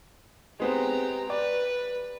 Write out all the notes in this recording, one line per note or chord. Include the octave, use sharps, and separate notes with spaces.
G#3 B3 C4 G4 A#5
B4 D5